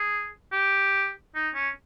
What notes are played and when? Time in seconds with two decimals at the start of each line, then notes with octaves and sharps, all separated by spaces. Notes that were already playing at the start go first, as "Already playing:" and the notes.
Already playing: G#4
0.53 G4
1.35 D#4
1.55 C#4